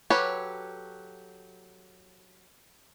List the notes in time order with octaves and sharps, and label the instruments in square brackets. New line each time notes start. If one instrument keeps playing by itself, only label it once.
[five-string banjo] F#3 G4 A4 B4 C#5